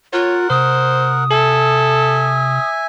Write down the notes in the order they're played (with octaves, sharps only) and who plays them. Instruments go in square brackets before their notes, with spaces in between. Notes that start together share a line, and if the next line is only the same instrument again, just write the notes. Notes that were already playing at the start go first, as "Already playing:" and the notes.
[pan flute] F4 [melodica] A#4 F#5 [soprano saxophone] C#5
[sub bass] C3 [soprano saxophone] C5 [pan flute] D#6
[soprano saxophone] A4 [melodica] E5 G#5